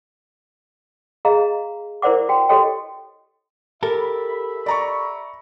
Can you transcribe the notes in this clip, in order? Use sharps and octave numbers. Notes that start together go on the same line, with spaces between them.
G#4 D#5 F5 A#5
E4 A#4 C5 D5 F#5 D6
F#4 G5
F#4 G4 A4 C#5 D#5 G5
G4 A4 A#4 E5 B5
D5 A#5 C#6